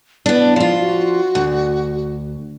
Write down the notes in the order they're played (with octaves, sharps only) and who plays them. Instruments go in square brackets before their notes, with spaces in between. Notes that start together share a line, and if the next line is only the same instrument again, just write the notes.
[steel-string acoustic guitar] B3 D4 [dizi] E4
[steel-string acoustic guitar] F3 F4
[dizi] F#4
[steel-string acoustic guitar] D2